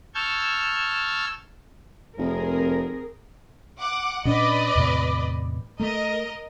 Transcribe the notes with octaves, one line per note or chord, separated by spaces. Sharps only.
A5 C#6 E6 F6 G6 G#6
F1 C4 G#4 A#4
F#5 D6
A#2 C#4 D4 B4 D5 D#5
E2 A2 C3
A3 A#4 D#5